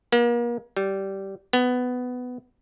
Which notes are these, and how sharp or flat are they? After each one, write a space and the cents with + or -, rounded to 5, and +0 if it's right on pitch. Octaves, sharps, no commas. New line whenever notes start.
A#3 +40
G3 -15
B3 +15